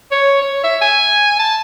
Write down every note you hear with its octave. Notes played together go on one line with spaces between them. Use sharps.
C#5
C#5
E5
G#5
A5